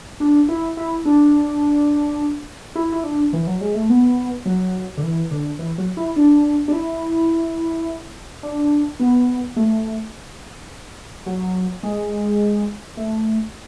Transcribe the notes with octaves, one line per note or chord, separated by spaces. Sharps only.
D4
E4
E4
D4
E4
E4
D4
E3
F#3
G#3
A3
B3
F#3
D3
E3
D3
E3
F#3
E4
D4
D4
E4
D4
B3
A3
F#3
G#3
A3